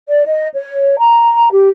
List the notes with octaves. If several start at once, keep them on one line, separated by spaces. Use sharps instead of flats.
D5
D#5
C#5
A#5
G4